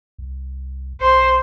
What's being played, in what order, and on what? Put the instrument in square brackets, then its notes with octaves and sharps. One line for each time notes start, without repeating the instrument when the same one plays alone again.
[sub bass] C2
[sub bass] B1 [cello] C5